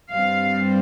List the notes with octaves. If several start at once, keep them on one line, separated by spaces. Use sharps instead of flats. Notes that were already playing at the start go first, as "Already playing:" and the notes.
G2 G3 C4 F5